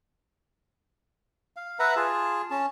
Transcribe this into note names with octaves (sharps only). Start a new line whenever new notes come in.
F5
B4 E5 F#5 A#5
F4 G#4 A5
C#4 A5